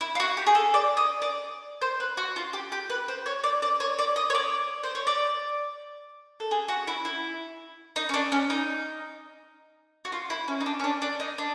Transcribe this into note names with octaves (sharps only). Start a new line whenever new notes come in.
E4
F4
F#4
G4
G#4
A4
D5
D#5
D5
C5
B4
F#4
F4
G4
G4
B4
C5
C#5
D5
D5
C#5
D5
D#5
C#5
D5
C5
C#5
D5
A4
G#4
F#4
E4
E4
D#4
C#4
D4
C#4
D#4
F#4
F4
E4
C#4
D#4
D4
C#4
D4
D4
D#4
D4